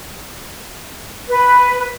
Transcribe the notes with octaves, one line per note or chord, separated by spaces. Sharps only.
B4